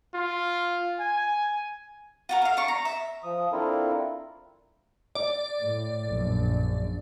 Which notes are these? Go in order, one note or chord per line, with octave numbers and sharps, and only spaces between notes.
F4
G#5
F4 F#4 A#4
A4 F5
D4 C#6
A#5
E5
F3 D#6
C4 D4 E4 F4 A4 A#4
D5
A2
A#1 F#2